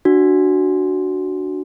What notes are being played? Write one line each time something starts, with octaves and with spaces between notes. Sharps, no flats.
D4 F#4